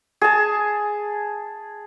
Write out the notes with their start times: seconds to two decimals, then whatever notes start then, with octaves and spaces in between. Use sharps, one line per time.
0.21 G#4 A5